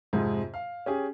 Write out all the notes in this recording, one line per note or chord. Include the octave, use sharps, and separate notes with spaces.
F2 G#2 C3
F5
C#4 G4 G#4